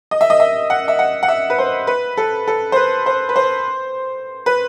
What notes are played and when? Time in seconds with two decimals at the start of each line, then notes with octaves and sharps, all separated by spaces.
0.11 D#5
0.21 E5
0.30 D#5
0.40 E5
0.70 F#5
0.88 E5
0.99 F#5
1.23 F#5
1.28 E5
1.50 B4
1.58 C5
1.87 B4
2.17 A4
2.48 A4
2.72 C5
2.76 B4
3.06 C5
3.29 B4
3.36 C5
4.46 B4